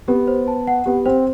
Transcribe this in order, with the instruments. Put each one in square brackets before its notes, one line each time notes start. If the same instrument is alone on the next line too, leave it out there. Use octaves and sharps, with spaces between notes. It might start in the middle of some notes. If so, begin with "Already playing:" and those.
[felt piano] B3 [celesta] G4
[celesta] C5
A5
F#5
[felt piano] B3 [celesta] G4
[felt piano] C4 [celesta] C5